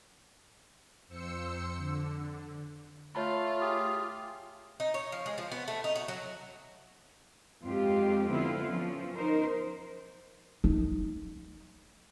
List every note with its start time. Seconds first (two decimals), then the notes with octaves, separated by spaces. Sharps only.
1.08 F2 C5 E6 C#7
1.76 D3
3.15 A3 F4 C#5 A5 B5
3.60 G4 G#4
4.80 D#4
4.94 C#5
5.12 F3
5.26 G#3
5.38 F3
5.52 B3
5.68 A3
5.84 D#4
5.96 F#4
6.08 F#3
7.63 F2 G#3 C4 F4 G4
8.30 D3 F3 B3 C4 E4 F4
8.67 F3 F#3 B3 C#4
9.15 D#4 A#4 C5
10.64 D#4